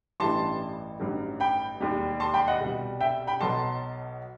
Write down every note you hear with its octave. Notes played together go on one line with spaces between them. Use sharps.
A1 G2 E3 G3 A5 C6
A1 G2 D#3 F#3
G5 B5
E1 D#2 D#3 G3
A5 C6
G5 B5
D#5 F#5
C2 B2 G3
E5 G5
G5 B5
B1 B2 F#3 A5 C6